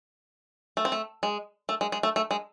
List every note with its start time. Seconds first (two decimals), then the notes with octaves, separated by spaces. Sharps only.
0.77 A3
0.85 C4
0.92 A3
1.23 G#3
1.69 A3
1.81 G#3
1.92 G#3
2.03 A3
2.16 A3
2.31 G#3